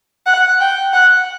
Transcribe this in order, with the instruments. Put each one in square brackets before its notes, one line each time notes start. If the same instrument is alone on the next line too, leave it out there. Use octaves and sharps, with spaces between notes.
[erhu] F#5
G5
F#5